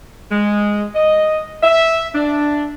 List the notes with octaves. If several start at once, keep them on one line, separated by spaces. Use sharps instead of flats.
G#3
D#5
E5
D4